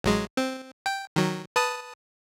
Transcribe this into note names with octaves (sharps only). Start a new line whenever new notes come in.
A1 F#3 G#3
C4
G5
D#3 F#3
B4 A5 D#6